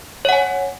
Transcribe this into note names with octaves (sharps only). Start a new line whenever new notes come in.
C#5 F#5 G#5